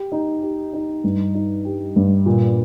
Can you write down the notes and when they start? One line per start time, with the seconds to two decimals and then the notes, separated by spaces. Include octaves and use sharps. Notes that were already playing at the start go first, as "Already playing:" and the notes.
Already playing: G4
0.12 D#4
0.42 G4
0.73 D#4
1.04 G2
1.34 D#4
1.65 G4
1.96 G2
2.26 A#2